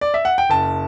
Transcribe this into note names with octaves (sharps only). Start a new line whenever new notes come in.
D5
E5
F#5
G5
F#1 A5